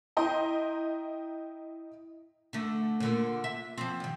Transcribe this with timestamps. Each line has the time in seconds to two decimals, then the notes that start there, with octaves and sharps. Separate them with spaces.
0.17 E4 D#5 G5 A#5 C6
2.53 D3 A3
3.00 A#2 D3
3.44 E5
3.77 F3 C4
4.00 G2 D#3